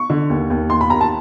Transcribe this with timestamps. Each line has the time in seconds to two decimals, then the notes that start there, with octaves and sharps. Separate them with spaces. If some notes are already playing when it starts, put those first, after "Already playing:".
Already playing: C#6
0.10 D3
0.30 D#2
0.50 D#2
0.70 D#2 C6
0.81 B5
0.90 D#2 A#5
1.01 A5